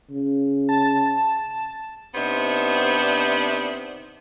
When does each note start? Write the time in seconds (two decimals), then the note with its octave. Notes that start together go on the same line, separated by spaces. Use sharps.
0.10 C#3
0.69 A5
2.15 C3 B3 D4 D#4 C5 E5